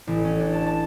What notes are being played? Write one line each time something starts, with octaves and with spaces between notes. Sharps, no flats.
A1
C#4
D4
A5
A5